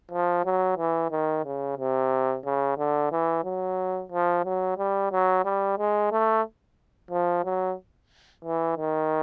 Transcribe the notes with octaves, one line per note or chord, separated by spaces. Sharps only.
F3
F#3
E3
D#3
C#3
C3
C#3
D3
E3
F#3
F3
F#3
G3
F#3
G3
G#3
A3
F3
F#3
E3
D#3